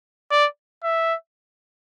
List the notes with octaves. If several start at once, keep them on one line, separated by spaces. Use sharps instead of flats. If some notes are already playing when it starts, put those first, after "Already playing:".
D5
E5